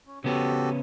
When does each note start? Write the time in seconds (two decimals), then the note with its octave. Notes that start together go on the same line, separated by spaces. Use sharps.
0.07 C#4
0.24 C#3 B3 C#4 F#4 G4 A4